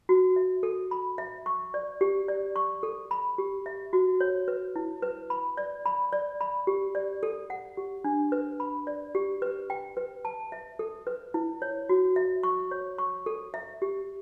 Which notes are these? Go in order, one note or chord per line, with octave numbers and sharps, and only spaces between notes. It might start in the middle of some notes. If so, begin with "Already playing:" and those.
F#4
E5
A4
B5
E5
C#6
D5
G4
D5
C#6
A4
B5
G4
E5
F#4
C#5
B4
E4
B4
B5
D5
B5
D5
B5
G4
D5
A4
F#5
G4
D4
B4
B5
D5
G4
B4
G5
B4
A5
E5
A4
B4
E4
C#5
F#4
E5
C#6
C#5
C#6
A4
E5
G4